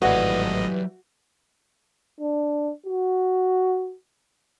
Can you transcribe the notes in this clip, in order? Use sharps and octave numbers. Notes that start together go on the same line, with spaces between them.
G#1 A2 E3 F#3 G3 F#4 D#5 F5
D4
F#4